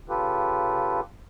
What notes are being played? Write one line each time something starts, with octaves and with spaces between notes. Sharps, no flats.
C#3 F4 G4 A4 B4